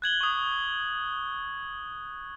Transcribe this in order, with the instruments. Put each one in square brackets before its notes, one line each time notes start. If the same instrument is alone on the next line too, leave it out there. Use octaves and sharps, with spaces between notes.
[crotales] F#6 G#6 F#7 G7
C#6 D#6